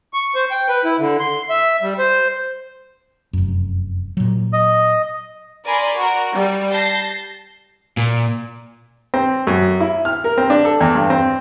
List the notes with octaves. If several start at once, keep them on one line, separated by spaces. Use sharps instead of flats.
C#6
C5
G5
B4
E4
D3
C6
E5
G3
C5
F1 F#2
A#2 F#3
D#5
A#4 D5 G#5 B5 C6
F#4 A#4
G3
A5 G6 A#6 C7
A#2
C4
F#2
E4
F6
A#4
C4
D4
A4
E2
G2
C4